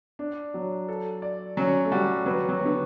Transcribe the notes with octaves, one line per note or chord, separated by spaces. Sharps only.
D4
F#3
A4
D5
F#3 C#4
A3
G3 F#4
F#3 B4
F#3
B3
D3